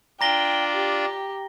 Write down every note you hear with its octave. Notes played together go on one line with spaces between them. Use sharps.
D4 F4 D5 G5 A#5 A#6 G7
G4